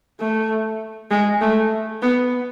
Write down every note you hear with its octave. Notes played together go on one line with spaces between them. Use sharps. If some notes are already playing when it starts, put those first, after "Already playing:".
A3
G#3
A3
B3